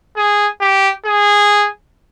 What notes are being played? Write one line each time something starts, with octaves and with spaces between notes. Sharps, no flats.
G#4
G4
G#4